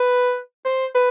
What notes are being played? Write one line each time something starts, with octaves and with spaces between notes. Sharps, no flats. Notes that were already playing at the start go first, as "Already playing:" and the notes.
Already playing: B4
C5
B4